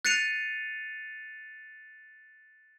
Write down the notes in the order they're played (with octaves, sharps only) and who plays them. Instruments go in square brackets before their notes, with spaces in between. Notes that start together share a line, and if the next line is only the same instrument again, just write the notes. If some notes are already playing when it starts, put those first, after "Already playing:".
[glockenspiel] F#6 A6 C7 C#7 D#7 F7